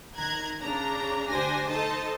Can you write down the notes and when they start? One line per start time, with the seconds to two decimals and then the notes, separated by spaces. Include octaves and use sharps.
0.16 D#3 A#5 F#6 G#6
0.61 C#3 D4 A#5
1.29 D2 D4 G4 C5 G#5 A#6
1.69 D#4 A4 C5 D#5 A5